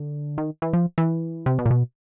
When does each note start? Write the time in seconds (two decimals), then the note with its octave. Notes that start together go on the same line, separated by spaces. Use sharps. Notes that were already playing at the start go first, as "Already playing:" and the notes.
Already playing: D3
0.38 D#3
0.62 E3
0.73 F3
0.98 E3
1.46 C3
1.59 B2
1.66 A#2
1.71 B2